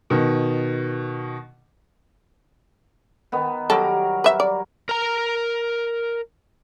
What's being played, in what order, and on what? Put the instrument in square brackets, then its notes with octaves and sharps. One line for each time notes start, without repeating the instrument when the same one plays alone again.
[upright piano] B2 D#3
[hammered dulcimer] D#3 B3
[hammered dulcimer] F#3 G3 A#4 [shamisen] A4
[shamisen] B4 E5
D5
[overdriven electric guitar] A#4 A#5